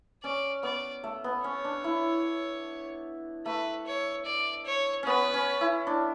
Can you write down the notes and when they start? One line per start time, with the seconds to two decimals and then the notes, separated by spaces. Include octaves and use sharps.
0.23 C#4 D5
0.63 B3 D5
1.04 A3
1.24 B3
1.44 C#4 C#5
1.65 D4
1.84 E4
3.46 A3 B4
3.86 C#5
4.26 D5
4.66 C#5
5.03 B3 C#4 B4
5.34 C#4
5.61 E4
5.87 D4